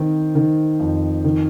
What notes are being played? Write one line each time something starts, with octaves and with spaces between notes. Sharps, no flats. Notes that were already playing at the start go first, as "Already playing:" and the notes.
Already playing: D#3 C4
D#3
F2
D#3